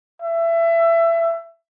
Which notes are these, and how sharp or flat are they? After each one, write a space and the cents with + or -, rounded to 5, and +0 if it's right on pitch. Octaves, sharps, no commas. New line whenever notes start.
E5 +25